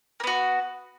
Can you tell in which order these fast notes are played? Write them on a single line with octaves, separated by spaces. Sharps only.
A#3 B3 F#4